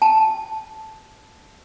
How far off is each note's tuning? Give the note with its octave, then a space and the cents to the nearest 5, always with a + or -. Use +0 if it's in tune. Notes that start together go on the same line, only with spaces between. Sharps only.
A5 -10